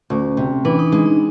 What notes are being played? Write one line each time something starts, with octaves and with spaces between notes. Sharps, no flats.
D2 C#4
C3
E3 D4
D#4
G#3 D#4
D#4